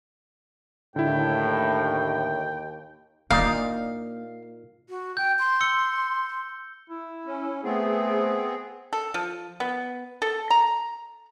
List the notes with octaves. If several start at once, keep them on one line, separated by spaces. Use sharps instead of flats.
D#2 A2 D3 E4 G5
A#2 A#3 D4 D#4 D5 F5
F#4
G5 G6
C6
E6 C#7 G7
E4
C#4
A3 B3 C4 G#4
A4
F3
B3
A4
A#5